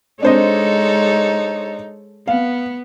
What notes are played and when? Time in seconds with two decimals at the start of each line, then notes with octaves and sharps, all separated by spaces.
0.23 G#3 D4 D#4 A4 C5 C#5 D#5
2.27 B3 F5